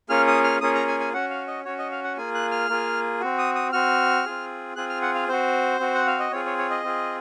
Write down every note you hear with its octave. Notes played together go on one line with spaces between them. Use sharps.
A#3 C#4 F4 G#4 F6
D#6
F6
A#3 C#4 F4 G#4 D#6
A#5
G#5
G#5
C#4 F#4 F#5
F5
D#5
C#4 F#4 C#5
D#5
F5
F#5
A#3 F4 G#4 G#5
F#6
F6
A#3 F4 G#4
C4 F#4
D#6
D#6
C4 F#4 F6
C4 F4 G#4
C4 F4 G#4 F#6
F6
F#5
F5
C4 F#4 C5
C4 F#4
F#5
F5
D#5
C4 F4 G#4 C#5
C#5
C#5
D#5
C4 F4 G#4